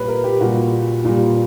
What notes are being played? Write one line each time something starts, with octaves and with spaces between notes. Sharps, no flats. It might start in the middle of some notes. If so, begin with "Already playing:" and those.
Already playing: A#2 G3 B4 C#5
A#4
G4
A#2 G3 F#4
A#2 G3